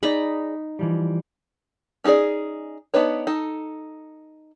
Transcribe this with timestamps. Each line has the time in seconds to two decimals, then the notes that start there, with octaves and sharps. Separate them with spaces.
0.03 D#4 G#4 D5 A#5 B5
0.79 E3 F3 G3
2.04 C#4 D#4 F#4 G#4 D5
2.94 B3 D4 D#4 B4 C#5
3.27 D#4 A4